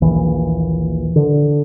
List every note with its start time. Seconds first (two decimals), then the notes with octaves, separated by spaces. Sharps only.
0.02 A#1 D#2 E3
1.16 D3